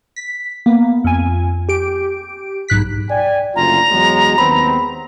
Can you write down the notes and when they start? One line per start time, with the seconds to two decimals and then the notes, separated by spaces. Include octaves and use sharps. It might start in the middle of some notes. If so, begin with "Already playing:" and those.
0.16 B6
0.66 A#3 B3
1.04 F2 G#5
1.69 G4 D7
2.68 B1 G#2 F#6 B6
3.10 D5 G5 G#5
3.56 F#1 D2 F4 A#5
3.90 E2 F#3 G#3
4.38 D#2 B3 C4 B5